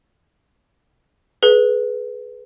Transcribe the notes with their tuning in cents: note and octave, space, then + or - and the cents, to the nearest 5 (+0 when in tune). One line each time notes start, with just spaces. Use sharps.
G#4 +30 B4 +0